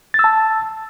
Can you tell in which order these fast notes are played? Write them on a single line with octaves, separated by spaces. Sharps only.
A6 E6 A5